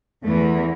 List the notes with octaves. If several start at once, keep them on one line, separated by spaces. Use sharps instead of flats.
E2 E3 A3